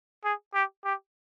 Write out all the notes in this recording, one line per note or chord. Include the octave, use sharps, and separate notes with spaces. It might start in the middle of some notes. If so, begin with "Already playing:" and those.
G#4
G4
G4